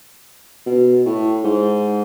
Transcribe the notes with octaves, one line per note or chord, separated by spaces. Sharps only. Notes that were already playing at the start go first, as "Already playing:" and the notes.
B2
A2
G#2